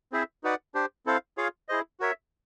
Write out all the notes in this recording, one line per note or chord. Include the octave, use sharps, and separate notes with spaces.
C4 E4 G#4 C5 E5
D#4 F#4 B4 D5 F#5
D4 G4 C5
C4 E4 A4 C5 F5
F4 G#4 C#5 F5
E4 G#4 C5 D#5
F#4 A#4 C#5 E5